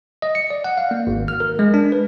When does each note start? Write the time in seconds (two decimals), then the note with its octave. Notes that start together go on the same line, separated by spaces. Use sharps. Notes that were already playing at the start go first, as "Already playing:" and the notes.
0.22 D#5
0.35 C#7
0.50 D5
0.64 F#5
0.78 F5
0.91 A#3
1.07 G#1
1.28 F6
1.40 A#4
1.59 G#3
1.74 D4
1.92 B4